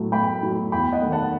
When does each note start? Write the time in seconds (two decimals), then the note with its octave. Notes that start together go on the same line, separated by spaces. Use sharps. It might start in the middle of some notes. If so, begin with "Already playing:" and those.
Already playing: A2 F#3 A3
0.12 A2 G5 B5
0.42 F#3 A3
0.72 E2 G5 B5
0.92 D#5 F#5
1.02 D#3 A3
1.12 F#5 A5